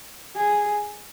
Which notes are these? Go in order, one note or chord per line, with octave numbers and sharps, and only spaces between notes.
G#4